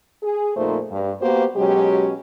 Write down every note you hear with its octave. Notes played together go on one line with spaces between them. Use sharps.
G#4
F2 A#2 A3 D#4 C5
G2
A#3 B3 F#4 G4 A#4 C5
B2 F#3 G#3 C#4 G4